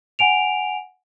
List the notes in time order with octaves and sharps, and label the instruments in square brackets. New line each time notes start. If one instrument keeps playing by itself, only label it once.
[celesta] F#5 G#5 D7 F7